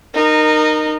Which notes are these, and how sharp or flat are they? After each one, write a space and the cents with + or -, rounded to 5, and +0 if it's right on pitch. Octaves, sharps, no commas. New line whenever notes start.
D#4 -20 A#4 +0